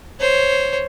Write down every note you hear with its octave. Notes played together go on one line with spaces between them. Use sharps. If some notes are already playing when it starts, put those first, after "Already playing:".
C5 C#5